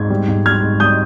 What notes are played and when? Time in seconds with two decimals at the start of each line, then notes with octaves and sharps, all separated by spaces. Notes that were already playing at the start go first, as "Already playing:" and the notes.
Already playing: G#2 G#6
0.10 G3
0.28 G#2
0.46 G3 F6 G#6
0.63 G#2
0.80 G3 D#6 G6